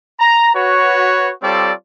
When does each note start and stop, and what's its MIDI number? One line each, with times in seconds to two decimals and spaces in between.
0.20 0.51 82
0.55 1.32 66
0.55 1.32 71
0.55 1.32 73
1.42 1.72 55
1.42 1.72 60
1.42 1.72 65
1.42 1.72 69
1.42 1.72 73
1.42 1.72 74